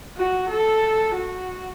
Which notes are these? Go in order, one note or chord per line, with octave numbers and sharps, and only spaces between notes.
F#4
A4
F#4